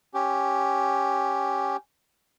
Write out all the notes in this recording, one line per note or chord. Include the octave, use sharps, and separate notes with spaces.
C#4 G4